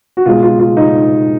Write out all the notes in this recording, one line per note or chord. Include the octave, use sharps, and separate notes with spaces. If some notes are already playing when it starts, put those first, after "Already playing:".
F#4
B2 G#3 F4
F4
F4
D#4